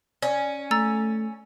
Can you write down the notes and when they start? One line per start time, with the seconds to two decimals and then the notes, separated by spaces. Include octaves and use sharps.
0.22 C#4 D5
0.71 A3 A#5 E6 A6